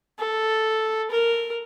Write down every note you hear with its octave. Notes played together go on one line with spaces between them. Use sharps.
A4
A#4